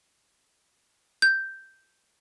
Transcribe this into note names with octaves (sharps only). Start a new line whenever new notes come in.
G6